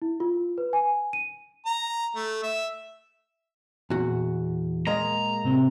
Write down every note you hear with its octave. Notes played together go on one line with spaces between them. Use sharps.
E4
F4
B4
G#5
D#7
A#5
A3
E5
E2 A#2 F#4
G#3 A#3 D#5 A#5
A2 C3 C4